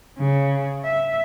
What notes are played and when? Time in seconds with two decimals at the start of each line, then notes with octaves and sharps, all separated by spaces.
0.18 C#3
0.85 E5